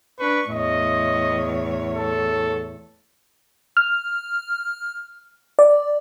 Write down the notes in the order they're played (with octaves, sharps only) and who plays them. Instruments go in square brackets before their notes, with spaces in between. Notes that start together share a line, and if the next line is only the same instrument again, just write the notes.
[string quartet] D4 C#6 [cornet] B4
[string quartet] E2 A2 C#5 [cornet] D#5
[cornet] A4
[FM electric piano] F6
D5